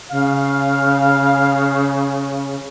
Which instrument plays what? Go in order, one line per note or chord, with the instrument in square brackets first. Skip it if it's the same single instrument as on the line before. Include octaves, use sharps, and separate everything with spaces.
[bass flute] C#3 [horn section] F5